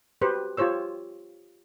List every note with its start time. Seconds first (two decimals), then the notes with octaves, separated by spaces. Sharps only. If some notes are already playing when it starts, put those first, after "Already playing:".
0.22 F#4 G4 B4 C5
0.57 F4 G4 C5 C#5 E6